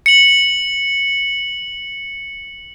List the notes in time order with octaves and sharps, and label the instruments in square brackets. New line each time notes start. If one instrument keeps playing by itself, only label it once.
[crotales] C#7 F#7